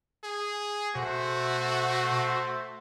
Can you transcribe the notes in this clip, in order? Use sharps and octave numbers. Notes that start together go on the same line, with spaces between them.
G#4
B2 A3 F#4 C5